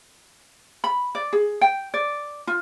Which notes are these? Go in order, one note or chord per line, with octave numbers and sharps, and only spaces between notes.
B5
D5
G#4
G5
D5
F4